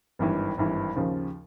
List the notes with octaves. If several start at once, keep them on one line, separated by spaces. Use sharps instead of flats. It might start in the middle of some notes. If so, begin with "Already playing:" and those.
G#1 G2 E3
G#1 G2 E3
D#2 C#3 F3